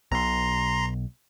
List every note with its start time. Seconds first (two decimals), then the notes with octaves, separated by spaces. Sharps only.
0.12 B1 B2 A#5 C6